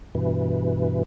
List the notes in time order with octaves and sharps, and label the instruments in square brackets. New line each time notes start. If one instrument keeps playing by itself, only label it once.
[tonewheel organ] G2 B2 E3